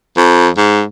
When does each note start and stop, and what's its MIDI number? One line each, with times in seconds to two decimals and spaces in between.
0.17 0.48 41
0.58 0.82 44